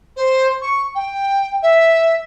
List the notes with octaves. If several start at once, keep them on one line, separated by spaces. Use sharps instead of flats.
C5
C#6
G5
E5